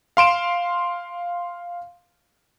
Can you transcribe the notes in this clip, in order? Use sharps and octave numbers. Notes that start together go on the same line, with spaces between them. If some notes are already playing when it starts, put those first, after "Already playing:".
F5 C6 D7 E7